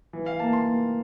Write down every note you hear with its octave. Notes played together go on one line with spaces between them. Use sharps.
E3
F5
A#3 A5
C6
A#3